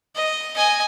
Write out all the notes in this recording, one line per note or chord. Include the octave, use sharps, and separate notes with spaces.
D#5
D#5 G#5